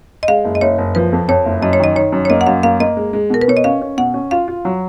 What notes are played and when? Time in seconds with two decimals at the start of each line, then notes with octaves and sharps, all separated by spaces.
0.23 D#5
0.28 G#3 F5
0.44 F#1
0.55 D#5
0.61 F#1 C#5
0.78 F#1
0.95 F3 B4
1.13 F2
1.28 F2 C#5
1.45 F#1
1.62 F#2 D#5
1.73 C#5
1.80 D#3 D#5
1.95 D#3 C#5
2.12 F#2
2.25 C#5
2.30 A#3 D#5
2.41 F#5
2.47 F#2 F5
2.63 A#3 F5
2.80 A#3 D#5
2.97 G#3
3.13 G#3
3.30 B2 A#4
3.41 B4
3.48 B2 C#5
3.57 D#5
3.64 C#4 F5
3.81 C#4
3.98 B2 F#5
4.14 C#4
4.31 F4 F5
4.48 F4
4.65 F#3